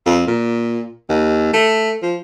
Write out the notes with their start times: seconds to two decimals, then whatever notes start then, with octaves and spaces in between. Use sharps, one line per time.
0.06 F2
0.27 A#2
1.09 D#2
1.54 A3
2.03 F3